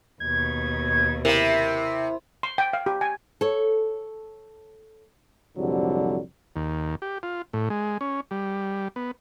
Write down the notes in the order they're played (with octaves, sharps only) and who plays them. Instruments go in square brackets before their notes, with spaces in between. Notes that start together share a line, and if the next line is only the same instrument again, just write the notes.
[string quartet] D#2 B2 [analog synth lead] G#6
[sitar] C3 [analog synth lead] E4 [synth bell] A#4 E5
[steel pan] C6
G5
F5
G4
G#5
[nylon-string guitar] A4 C#5
[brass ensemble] C2 F2 G#2 D3 F#3 G3
[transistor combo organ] D#2
G4
F4
A2
G#3
C#4
G3
B3